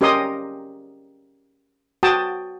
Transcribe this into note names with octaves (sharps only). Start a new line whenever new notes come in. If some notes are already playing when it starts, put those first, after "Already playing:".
C#4 G4 A#4 D#5 C6 D#6
F#4 G5 A5 D#6